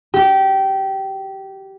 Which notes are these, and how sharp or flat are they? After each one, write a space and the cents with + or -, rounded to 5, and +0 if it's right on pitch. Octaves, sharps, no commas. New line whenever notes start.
G4 -20